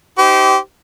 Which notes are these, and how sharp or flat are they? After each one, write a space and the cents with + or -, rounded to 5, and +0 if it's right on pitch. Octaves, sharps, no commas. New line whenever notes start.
D#4 +0 G4 -25 C5 -25